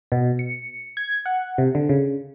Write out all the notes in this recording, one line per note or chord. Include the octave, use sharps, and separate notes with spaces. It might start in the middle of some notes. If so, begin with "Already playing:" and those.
B2
C#7
G#6
F#5
C3
D3
C#3